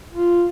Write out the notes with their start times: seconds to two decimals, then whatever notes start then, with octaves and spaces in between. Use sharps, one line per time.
0.13 F4